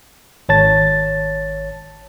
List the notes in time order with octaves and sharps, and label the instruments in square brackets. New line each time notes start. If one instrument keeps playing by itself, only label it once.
[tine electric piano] G#1 C#5 A5 A6